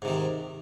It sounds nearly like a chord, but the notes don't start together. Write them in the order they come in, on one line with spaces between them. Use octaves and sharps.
G#2 C3 D#3